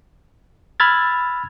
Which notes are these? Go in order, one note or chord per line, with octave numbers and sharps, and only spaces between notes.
B5 E6 F6 G#6 A6